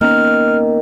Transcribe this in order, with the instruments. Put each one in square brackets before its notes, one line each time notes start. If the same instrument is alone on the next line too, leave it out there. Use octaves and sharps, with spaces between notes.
[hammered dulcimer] D#3 [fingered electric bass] A#3 B3 C#4 [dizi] F6